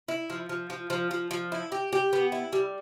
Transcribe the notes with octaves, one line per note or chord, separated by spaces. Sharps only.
E4
F3
F3
F3
F3
F3
F3
E4
G4
G4
B3
E4
G3